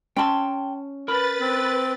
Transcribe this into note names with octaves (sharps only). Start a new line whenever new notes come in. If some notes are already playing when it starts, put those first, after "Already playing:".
C#4 G5 A5 B5 C6
A#4 B4 B5 A6
C4